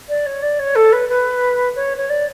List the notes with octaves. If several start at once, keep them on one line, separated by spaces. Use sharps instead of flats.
D5
C#5
D5
C#5
A4
B4
B4
C#5
C#5
D5